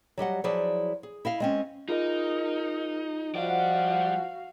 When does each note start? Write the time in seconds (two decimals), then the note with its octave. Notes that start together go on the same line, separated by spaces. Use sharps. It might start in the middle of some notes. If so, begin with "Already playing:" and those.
0.18 F#3 G3 D#5 F#5
0.44 F3 F#3 E4 G#4 D5
1.03 G#4
1.25 E4 D#5 F5
1.40 G#3 C4 C#4
1.89 D#4 F4 G#4 A#4 D#5
3.35 F3 G3 F#4 D5 F5 F#5